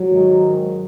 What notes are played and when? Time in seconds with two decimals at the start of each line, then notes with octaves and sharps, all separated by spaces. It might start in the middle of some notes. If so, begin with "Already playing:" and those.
Already playing: F#3
0.08 G#2 D#3